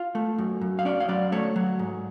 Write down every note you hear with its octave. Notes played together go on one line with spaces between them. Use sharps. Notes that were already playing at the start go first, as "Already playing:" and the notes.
Already playing: F4 F5
A3
F#2
F#2
F5
C#4 D5
F5
F#3 D5
A3 C#5
F#3
G#2